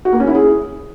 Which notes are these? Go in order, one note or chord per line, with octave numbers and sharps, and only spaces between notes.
F#4
A#3
C#4
E4
G#4